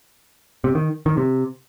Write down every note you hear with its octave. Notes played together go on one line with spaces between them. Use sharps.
C3
D#3
D#3
C3